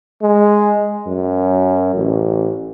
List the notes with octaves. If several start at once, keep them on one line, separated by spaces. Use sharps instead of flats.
G#3
F#2
A1